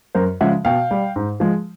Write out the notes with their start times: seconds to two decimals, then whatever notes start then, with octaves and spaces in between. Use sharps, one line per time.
0.15 F#2 A#4 C5
0.41 C#3 F3 G#3 E5 F#5
0.65 B2 F5 G5
0.91 G3
1.16 G#2
1.40 F3 G#3